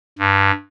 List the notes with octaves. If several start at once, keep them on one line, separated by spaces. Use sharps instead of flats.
G2